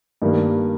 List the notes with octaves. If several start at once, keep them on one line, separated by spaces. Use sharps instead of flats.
G2 D#3 G3 A#3